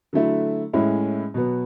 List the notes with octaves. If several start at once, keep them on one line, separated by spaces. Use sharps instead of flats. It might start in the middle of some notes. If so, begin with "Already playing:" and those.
D3 F#3 A3 E4
A2 G#3 C#4 E4
B2 F#3 B3